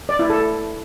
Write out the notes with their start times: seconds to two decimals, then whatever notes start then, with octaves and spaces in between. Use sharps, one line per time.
0.09 D5
0.19 E4
0.30 A4